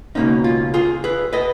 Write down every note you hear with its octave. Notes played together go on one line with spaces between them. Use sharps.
C#2 B2 A#3 C#4 D#4
F4
F4 G#4
G#4 B4
B4 D#5